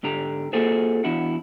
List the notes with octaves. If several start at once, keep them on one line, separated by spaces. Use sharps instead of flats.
G#2 D3 G4 A#5
A#3 F4 F#4 G#4 A4 C5
E2 D4 E4 F#4 F#5